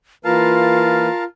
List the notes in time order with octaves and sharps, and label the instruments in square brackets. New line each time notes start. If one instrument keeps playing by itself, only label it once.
[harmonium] E3 A#3 B4 [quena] F4 [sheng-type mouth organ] A#4 F5 A5